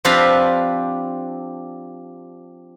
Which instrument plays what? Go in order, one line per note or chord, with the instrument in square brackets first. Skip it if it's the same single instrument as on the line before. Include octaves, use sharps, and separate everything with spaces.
[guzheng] F3 C4 D4 G4 B4 F5